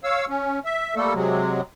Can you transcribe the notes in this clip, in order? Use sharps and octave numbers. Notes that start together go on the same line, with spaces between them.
C#5 F5 E6
C#4
E5
G3 A3 A#3 A4
C3 F#3 G#3